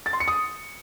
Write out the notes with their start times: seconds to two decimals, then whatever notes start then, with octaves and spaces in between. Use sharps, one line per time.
0.06 A6
0.13 C6
0.20 C#7
0.28 D#6